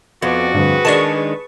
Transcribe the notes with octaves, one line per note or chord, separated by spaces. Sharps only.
F2 B3 F#4 D5
D2 G2 G#4 B4
D#3 G#3 D4 A5 C#6